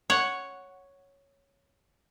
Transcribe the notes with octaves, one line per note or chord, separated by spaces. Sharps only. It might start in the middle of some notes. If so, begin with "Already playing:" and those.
C#5 F#5